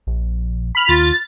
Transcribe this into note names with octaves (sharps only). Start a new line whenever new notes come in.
A#1
B5 F6
D#2 F4 A6